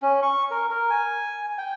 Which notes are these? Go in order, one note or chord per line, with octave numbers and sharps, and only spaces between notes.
C#4
C#6
A#4
A#4
G#5
G5